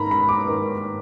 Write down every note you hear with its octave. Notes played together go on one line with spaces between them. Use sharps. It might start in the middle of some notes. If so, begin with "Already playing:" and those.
Already playing: G#2 D#3 A#3 A#5 B5
B5
D6
G#2 D#3 A#3